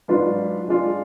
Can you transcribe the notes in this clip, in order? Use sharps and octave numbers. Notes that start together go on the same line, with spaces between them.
G#2 F#3 D4 F4 B4
G#3 D4 F4